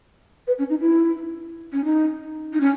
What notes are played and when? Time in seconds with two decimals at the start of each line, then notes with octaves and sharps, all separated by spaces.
0.47 B4
0.59 C#4
0.70 D#4
0.81 E4
1.73 C#4
1.84 D#4
2.53 D#4
2.60 C#4